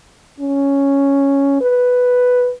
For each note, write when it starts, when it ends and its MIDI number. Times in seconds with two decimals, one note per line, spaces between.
0.40 1.60 61
1.61 2.51 71